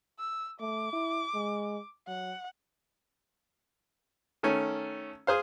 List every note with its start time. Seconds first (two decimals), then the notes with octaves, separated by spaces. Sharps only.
0.19 E6
0.60 A3 D6
0.93 E4
1.34 G#3
2.08 F#3 F#5
4.43 D#3 A3 C#4
5.27 G#4 C5 F5